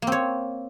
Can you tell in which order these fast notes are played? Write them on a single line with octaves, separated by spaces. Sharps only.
A#3 C4 C#5